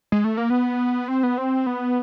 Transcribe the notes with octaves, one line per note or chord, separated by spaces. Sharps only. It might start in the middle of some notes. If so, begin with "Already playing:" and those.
G#3
A3
A#3
B3
C4
B3
C4
B3